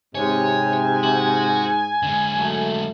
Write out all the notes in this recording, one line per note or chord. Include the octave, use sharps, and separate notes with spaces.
G#2 C3 C#5 G#5
F#4
D3 G#3
F#3 A3